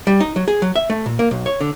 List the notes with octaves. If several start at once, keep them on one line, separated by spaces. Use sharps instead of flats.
G3
D#4
F#3
G#4
F#3
E5
A3
A#2
A#3
B1
C#5
D3